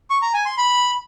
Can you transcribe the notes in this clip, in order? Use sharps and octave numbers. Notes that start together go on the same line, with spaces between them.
C#6
A#5
G#5
C6
B5